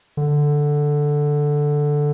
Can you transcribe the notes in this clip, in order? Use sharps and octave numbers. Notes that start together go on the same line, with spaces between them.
D3